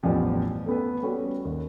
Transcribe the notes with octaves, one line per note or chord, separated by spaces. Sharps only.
A1 E2 G2 F3 G4
A3 B3 B4
G3 A3 B3 C#4 F#4
D#2